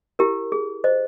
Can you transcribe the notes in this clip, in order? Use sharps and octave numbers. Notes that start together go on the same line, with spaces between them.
E4 G4 A#4
G#4
C5 D#5